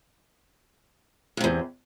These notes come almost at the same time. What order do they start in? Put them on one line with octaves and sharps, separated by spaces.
G2 C3 E2